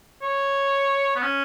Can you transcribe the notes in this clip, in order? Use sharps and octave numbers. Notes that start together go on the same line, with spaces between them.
C#5
B3
C#4